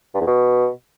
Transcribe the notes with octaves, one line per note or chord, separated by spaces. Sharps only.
G2
E2
B2